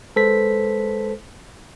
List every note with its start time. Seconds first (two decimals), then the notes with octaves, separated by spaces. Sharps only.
0.16 G#3 A4 B4 C5 B6